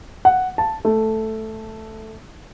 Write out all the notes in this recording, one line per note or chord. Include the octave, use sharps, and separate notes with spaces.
F#5
A5
A3